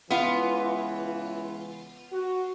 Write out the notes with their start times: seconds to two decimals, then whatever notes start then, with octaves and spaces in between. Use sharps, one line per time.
0.10 C#2 E3 B3 F4
2.12 F#4